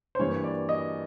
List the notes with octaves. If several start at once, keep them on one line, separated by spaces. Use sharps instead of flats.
C5
G2 E3 G3 A#3 C#5
D5
D#5